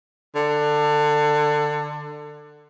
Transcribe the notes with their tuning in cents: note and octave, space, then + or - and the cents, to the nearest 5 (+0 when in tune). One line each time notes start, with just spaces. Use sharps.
D3 +20